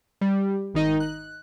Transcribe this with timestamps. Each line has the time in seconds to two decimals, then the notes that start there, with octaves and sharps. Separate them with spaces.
0.21 G3
0.74 G#1 D#3 D#4 D#5
1.00 F#6